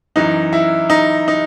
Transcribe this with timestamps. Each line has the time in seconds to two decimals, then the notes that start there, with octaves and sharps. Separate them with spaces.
0.16 F#2 E3 D#4
0.53 E4
0.90 D#4
1.28 D#4